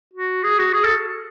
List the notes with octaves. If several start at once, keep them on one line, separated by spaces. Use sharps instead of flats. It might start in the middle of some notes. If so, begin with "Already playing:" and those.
F#4
G#4
F#4
G#4
A4